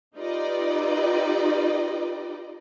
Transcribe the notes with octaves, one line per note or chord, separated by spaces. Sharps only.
D#4 F4 G4 B4 D5 D#5